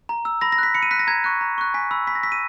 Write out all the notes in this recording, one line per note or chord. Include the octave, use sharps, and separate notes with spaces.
A#5
E6
B5 A#6
A#6
F#6 B6
B5 C#7
D#7
F#6 B6
A#6
A#5 G#6
C#6 F#6
A#5
C#6 F#6
G#5 B6
B5 E6
B5 B6
A#6
E6 B6
D#7